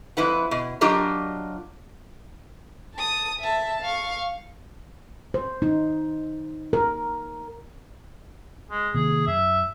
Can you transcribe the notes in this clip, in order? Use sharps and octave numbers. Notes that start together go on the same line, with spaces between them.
F2 E4 B4 F#5
B2
F#3 D4 F4 G4 A#4 D#5
A5 D#6
E5 A5
F5 C#6
C5
D#4
A#4
G#3
C3 D#3 A#3 G#4
F#2 E5